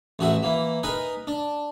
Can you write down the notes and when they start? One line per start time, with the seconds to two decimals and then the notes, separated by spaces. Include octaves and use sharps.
0.19 A1 F#4 G#4 E5
0.43 E3 A#3
0.83 D#4 G#4 A#4 B4
1.27 D4